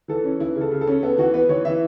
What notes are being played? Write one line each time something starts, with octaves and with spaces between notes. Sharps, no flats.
E3 A4
C#4
E3 E4
C#3
A4
C#3
A4
C#4
B3 A4
E3 F#4
B3 B4
E3 C#5
E3 E5